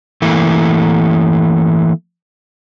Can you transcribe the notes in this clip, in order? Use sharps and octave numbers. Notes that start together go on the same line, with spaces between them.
E3 A3 A#3